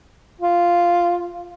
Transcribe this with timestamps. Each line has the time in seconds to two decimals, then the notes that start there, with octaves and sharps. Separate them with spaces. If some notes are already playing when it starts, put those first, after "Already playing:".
0.41 F4